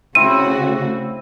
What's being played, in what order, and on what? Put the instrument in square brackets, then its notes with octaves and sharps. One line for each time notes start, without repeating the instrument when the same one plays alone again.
[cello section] C#3 A3 F#4 [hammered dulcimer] C4 E4 [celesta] D#7